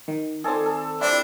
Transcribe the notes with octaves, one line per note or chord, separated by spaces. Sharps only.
D#3
D#3 C4 G#4 A4 D5
A4
G3 C4 D4 E4